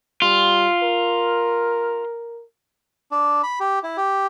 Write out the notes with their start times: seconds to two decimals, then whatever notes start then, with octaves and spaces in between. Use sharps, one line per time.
0.22 G3 F4
0.82 A#4
3.11 D4
3.43 B5
3.60 G4
3.83 E4
3.97 G4